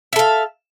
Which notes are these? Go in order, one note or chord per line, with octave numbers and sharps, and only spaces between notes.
A4 E5 F5